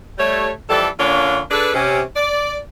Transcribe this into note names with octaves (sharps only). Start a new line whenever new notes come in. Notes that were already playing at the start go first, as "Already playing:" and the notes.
G3 A3 C#5
F2 E3 G3 A4
D3 A#3 C#4 D4 F4 C#5
D4 G#4 A4 B4
C3 C#4
D5